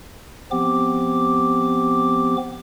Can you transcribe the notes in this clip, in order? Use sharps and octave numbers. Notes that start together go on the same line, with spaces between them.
F3 B3 C4 G4 D6